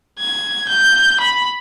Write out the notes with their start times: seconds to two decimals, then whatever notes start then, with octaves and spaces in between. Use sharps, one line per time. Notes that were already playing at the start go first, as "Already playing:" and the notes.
0.19 G#6
0.68 G6
1.20 B5